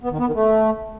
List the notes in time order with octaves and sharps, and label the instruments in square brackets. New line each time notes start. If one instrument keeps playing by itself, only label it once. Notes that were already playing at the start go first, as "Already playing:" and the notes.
[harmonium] B3
D#3
B3
D#3
A3